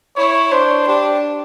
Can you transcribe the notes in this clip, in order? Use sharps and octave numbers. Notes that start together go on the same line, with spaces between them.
E4 C#5
D4 C5
D4 G4